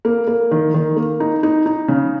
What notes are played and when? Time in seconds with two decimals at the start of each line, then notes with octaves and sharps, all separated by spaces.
0.05 A#3
0.27 A#3
0.51 D#3
0.74 D#3
0.96 A#3
1.20 D#4
1.43 D#4
1.66 D#4
1.88 C#3